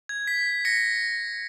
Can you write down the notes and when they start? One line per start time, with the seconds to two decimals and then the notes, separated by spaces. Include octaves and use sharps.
0.09 G#6
0.27 B6
0.65 A#6 C#7